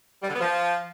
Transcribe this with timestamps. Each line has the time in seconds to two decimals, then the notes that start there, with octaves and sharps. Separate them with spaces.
0.22 G3
0.28 D3
0.34 B3
0.40 F3